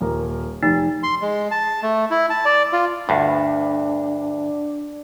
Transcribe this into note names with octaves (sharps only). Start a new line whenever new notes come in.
D#1 A#4
F1 D#4
C6
G#3
A5
A3
E4
A5
D5
F4
D2 G2 D4